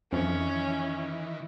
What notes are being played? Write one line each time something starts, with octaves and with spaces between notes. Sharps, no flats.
F2 D#3 E3 C#4